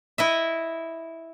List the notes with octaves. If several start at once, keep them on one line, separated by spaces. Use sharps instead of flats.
E4 D#5 E5